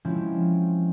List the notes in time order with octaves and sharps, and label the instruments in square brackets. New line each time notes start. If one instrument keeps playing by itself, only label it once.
[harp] F3 G#3 C4 C#4 E4